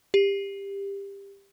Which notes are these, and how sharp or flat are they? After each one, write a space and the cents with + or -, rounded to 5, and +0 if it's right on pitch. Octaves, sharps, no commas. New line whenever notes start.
G4 +20